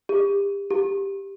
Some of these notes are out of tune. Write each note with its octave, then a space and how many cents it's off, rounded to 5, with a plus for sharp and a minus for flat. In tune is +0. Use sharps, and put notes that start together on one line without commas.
G4 +35
G4 +5